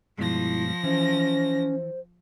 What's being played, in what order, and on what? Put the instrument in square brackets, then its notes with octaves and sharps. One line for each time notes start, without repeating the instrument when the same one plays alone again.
[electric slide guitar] G2 B2 G#3 [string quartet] F3 A#6 [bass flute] E4
[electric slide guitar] E3 [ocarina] C#4 [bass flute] C5